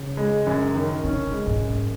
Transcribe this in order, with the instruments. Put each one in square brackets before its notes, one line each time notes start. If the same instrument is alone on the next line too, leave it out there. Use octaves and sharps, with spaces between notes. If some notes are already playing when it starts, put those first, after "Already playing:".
Already playing: [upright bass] C#3
[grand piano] G#3
F#2
D#3
[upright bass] C#3 [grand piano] C#4
[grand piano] G#3
[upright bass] G#2
[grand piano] F#2